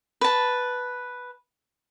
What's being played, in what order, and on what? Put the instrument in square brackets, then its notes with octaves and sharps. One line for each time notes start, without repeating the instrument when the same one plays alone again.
[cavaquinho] B4 A5